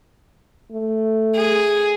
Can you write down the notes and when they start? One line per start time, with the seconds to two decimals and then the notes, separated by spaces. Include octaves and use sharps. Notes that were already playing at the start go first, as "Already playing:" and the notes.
0.72 A3
1.36 G#4